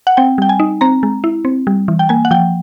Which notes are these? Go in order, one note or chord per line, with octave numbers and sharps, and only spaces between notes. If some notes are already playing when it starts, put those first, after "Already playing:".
F#5
C4 G5
G3 G5
G#5
D#4
C4 A#5
G#3
E4
C4
G3
E3
G5
A#3 G#5
F#5
F3 G5